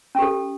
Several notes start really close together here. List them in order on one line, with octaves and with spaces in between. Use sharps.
C#4 G4 A4